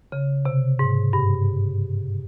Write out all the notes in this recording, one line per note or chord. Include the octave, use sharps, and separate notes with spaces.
C#3
C3
G#2
G2